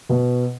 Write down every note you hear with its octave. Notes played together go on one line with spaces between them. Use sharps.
B2